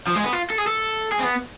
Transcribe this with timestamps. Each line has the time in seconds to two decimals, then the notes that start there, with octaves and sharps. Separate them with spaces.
0.07 F3
0.15 G#3
0.24 B3
0.33 F4
0.50 A4
0.58 G#4
0.67 A4
1.12 G#4
1.20 C4
1.24 B3